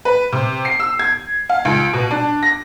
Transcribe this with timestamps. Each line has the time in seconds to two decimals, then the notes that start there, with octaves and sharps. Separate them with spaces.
0.05 B4
0.32 C3
0.65 C7
0.80 E6
0.99 G#6
1.49 F5
1.65 C#2
1.93 B2
2.11 D4
2.43 A#6